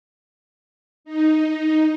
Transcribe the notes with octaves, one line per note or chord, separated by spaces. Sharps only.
D#4